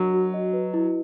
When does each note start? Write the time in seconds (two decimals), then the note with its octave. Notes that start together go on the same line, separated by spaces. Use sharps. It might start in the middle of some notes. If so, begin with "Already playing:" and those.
Already playing: F#3 D4 F#4 A#4 D#5
0.14 F#4
0.34 D#5
0.53 B4
0.74 E4